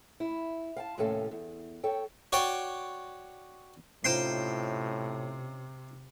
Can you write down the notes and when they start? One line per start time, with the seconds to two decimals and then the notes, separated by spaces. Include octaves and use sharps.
0.20 E4
0.76 F5 G5 A5
0.98 D#2 A2 C3 C#4 A4 F5
1.31 E2
1.84 A4 C#5 G5
2.32 F#4 C#5 D5 G5
4.04 A2 C3 C#4 D#4 F4 C5 G5 C6